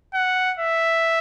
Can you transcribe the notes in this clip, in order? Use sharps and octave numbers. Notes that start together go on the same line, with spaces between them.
F#5
E5